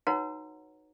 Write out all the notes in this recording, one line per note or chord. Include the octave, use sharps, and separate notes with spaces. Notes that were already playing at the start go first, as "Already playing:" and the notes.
D#4 F#4 B4 C#5 F#5 A#5